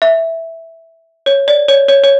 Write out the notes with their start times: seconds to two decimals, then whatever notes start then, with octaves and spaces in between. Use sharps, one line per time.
0.02 E5
1.26 C#5
1.48 D5
1.68 C#5
1.89 C#5
2.04 C#5